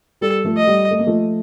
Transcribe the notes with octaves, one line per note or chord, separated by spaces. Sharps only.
G3 A4
F3 A3
D#5
G3
A3
A#3
F3 A3